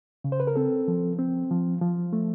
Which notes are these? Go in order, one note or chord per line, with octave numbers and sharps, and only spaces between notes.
C#3
C5
B4
A#4
C4 A4
F3
C4
F3
F3
A3